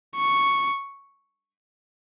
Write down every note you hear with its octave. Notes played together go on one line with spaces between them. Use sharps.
C#6